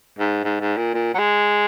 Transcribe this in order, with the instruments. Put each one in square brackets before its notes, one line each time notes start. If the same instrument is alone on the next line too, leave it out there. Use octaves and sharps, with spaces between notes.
[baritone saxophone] G#2
G#2
G#2
A#2
A#2
F#3
G#3